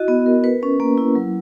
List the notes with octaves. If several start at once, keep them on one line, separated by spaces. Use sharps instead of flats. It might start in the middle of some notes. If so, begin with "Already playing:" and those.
Already playing: E4 F#4 D#5
B3
A#4
B4
C#4
A#3
E4
F#3